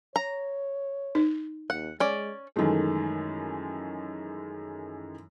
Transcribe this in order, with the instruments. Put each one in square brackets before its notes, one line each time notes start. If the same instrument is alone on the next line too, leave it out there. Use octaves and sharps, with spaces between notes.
[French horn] C#5 [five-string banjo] A#5
[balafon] D#4
[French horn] D#2 [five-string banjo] F#5
[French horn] G#3 [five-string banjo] C#4 D5
[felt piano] F#2 D#3 E3 G#3 A3